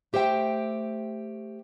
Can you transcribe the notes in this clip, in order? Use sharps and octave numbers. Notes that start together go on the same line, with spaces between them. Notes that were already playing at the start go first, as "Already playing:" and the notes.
A3 G4 C5 E5 G5